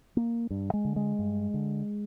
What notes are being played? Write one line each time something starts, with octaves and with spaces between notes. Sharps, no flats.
A#3
G2
G#3
D3
G#3
G2
D3